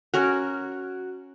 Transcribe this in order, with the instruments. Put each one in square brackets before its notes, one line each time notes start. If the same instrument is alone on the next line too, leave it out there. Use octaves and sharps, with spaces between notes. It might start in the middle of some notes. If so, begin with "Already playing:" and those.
[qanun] C#4 A#4 [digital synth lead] F#4